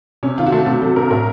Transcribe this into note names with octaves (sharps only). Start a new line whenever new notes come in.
C3 C#4
D#3 F4
F#4
A3 A4
C3 F#4
F#3 A4
C2 A#4
A2 A#4